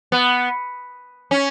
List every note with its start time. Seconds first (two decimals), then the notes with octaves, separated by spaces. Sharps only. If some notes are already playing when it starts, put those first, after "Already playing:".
0.12 B3
1.31 C#4